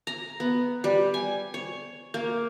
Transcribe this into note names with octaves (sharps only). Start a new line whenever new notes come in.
A#5
B3
G3
G#5
C#5
A#3